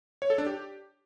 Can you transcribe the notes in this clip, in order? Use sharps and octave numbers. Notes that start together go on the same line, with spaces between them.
C#5
A4
D4
G4